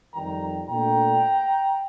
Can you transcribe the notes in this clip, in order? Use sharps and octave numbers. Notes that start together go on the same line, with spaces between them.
F2 D#3 G3 G5 A#5
A#2 A3 D4 G5 A#5